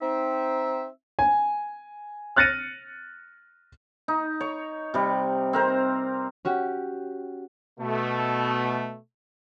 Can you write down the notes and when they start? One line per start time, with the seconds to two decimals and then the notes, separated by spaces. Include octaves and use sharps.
0.01 C4 D#4 E5
1.19 G#5
2.36 F6 F#6 A6 A#6 C#7 D#7
4.08 D#4
4.41 C#5
4.94 C3 G3
5.53 C4 A#4 C5
6.45 C#4 F#4 G4
7.80 B2 A3